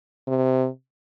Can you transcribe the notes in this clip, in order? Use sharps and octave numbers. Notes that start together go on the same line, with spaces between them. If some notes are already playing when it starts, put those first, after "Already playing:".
C3